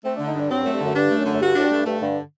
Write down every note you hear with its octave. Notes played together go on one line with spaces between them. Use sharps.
A3 C4
D3 D4
D#4
G2 D4
F#3 C4
F#2 A3
G2
F#2 D3
G2 D4
A3
F#2
D3
F#2
G2 F#4
A2 D4
G2
A3
G2 A3
G2 D3